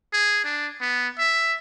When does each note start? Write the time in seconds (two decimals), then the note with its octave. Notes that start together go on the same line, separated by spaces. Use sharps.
0.13 G#4
0.44 D4
0.81 B3
1.19 E5